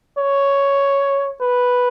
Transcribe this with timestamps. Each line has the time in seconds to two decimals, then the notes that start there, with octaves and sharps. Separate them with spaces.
0.18 C#5
1.41 B4